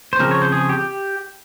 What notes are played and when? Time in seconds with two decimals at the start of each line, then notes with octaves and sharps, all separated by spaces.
0.13 C5
0.19 C#3 F3 C4 A#4
0.31 C#5
0.42 C5
0.52 G#4
0.69 G4